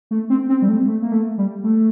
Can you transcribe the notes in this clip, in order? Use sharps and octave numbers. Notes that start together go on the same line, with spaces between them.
A3
C4
C4
G3
A3
A3
A#3
A3
G3
A3